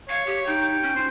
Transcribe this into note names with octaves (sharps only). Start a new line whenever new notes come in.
C#5 F5
G4
D#4 G5
C#4
F4 C5